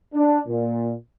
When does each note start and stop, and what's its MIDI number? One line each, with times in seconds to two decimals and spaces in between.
0.15 0.40 62
0.48 0.92 46